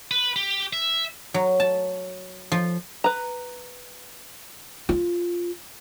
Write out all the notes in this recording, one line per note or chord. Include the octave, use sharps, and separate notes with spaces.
B4
G4
E5
F#3
A5
F3
B4 A#5
F4